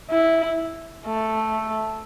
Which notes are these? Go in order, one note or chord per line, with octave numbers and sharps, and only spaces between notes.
E4
A3